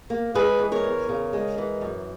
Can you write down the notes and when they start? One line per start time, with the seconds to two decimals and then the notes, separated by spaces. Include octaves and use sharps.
0.10 A#3
0.34 G#3 G#4 B4
0.59 E3
0.72 A#4 C#5
0.84 E2
1.09 C#3
1.33 G#3
1.58 E3
1.81 F#2